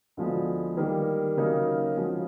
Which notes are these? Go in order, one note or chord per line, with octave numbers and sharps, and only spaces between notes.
D2 D3 F3 G#3 B3
D#3 G3 A#3
C#3 F#3 A#3 D#4
C#3 F3 G#3 C#4 F#4